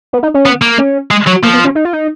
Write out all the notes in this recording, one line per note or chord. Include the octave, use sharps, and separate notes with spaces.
B3
D#4
C#4
B3
A#3
C#4
G#3
F#3
F3 A#3
B3
C#4
D#4
F4
D#4